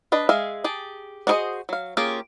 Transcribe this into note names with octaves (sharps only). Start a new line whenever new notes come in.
D4 B4 D#5
G#3 G#4 E5 F5
G4 G#4 A5
D4 F#4 G#4 C5 D#5
F#3 F5
A#3 C#4 F4 G4 G#4